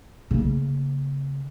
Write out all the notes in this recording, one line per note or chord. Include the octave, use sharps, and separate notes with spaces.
C#3 A#3